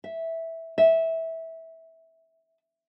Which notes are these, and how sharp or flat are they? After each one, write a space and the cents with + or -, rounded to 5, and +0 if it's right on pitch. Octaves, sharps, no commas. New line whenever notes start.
E5 -10
E5 -15